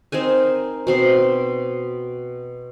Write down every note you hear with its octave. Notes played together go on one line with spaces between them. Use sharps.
C4 D#4 A#4 G#5
B2 C4 C6